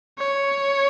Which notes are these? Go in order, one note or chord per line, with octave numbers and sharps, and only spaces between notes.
C#5